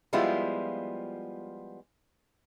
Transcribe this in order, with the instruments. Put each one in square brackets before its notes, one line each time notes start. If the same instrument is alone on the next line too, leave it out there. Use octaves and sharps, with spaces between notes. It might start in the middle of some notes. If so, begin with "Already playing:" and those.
[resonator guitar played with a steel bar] F3 G3 G#3 B3 E4 F4